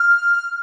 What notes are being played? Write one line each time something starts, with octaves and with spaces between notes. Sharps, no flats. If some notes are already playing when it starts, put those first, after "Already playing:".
Already playing: F6